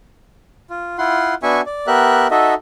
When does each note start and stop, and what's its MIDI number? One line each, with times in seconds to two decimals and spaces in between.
0.70 0.98 65
0.98 1.35 64
0.98 1.35 65
0.98 1.35 78
0.98 1.35 84
1.43 1.61 59
1.43 1.61 62
1.43 1.61 66
1.43 1.61 76
1.43 1.61 80
1.43 1.61 85
1.66 1.87 74
1.87 2.27 59
1.87 2.27 67
1.87 2.27 70
1.87 2.27 76
1.87 2.27 90
2.31 2.54 63
2.31 2.54 66
2.31 2.54 69
2.31 2.54 75
2.31 2.54 76